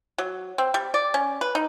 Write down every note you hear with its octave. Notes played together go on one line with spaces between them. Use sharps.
F#3
C4
G3
D5
C#4
B4
D#4